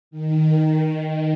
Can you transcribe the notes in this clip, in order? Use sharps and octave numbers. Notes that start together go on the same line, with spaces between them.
D#3